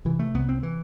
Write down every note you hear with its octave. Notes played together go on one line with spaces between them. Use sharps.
C3 E3
A3
C2 B3
C4
E3